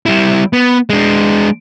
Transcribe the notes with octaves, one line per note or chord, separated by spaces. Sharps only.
G3 E4
B3
G#3 D4